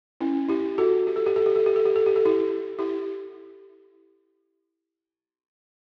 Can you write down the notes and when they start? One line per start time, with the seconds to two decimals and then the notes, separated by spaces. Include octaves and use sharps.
0.21 C#4 E4
0.49 E4 G4
0.78 F#4 A4
1.07 G4
1.16 A4
1.26 G4
1.36 A4
1.46 G4
1.56 A4
1.66 G4
1.76 A4
1.85 G4
1.96 A4
2.06 G4
2.16 A4
2.25 E4 G4
2.79 E4 G4